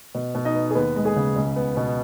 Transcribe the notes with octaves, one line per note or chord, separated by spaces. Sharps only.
B2
B2
D#4 D#5
B3
G#4
D#2 B3 B4
G#3
G#4
C#3
C#2
B3
B2